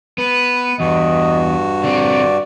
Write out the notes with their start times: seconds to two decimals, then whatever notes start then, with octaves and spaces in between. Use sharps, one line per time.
0.18 B3 B4
0.80 E2 G2 F#4 D#5
1.84 D3 C4 D5